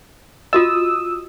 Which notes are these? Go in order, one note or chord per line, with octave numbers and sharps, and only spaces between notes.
F4 F#4 D#5 D#6 E6